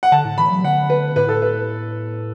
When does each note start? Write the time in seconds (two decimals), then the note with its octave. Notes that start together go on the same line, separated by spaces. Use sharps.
0.03 F#5
0.12 D3 A5
0.25 A2
0.38 E3 B5
0.51 F#3
0.64 D3 F#5
0.90 B4
1.16 A2 B4
1.29 A4
1.42 B4